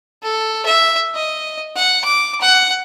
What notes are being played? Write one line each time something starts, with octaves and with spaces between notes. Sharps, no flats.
A4
E5
D#5
F#5
D6
F#5